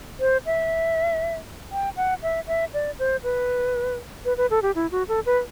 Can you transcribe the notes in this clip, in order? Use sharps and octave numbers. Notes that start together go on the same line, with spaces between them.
C5
E5
G5
F#5
E5
E5
D5
C5
B4
B4
B4
A4
G4
E4
F#4
A4
B4